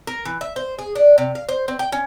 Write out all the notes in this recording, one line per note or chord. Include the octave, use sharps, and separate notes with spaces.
A#4
E3
E5
C5
G#4
D4
C3
F5
C5
C4
G5
C#4